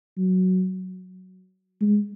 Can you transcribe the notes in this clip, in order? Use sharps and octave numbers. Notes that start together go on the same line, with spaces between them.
F#3
G#3